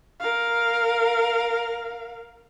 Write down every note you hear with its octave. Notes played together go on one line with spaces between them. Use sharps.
A#4 F5